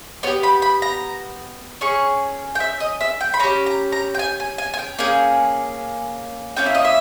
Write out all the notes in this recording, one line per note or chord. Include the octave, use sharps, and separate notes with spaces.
B3 G4 C#5
B5
B5
A#5
C#4 G#4 C#6
G5
E5
D#5
E5
G5
B5
C#4 G4 A#5
A#5
A#5
G5
G#5
G#5
G#5
G#5
G5
A#3 C#4 G#4
A#3 C#4 E4 G5
E5
D#5
E5